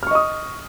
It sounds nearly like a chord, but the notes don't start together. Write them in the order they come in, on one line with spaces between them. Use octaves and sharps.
F6 C#6 D#5 D#6